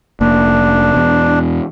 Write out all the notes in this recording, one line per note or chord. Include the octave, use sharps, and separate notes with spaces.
F1 A#3 D4
E2 B2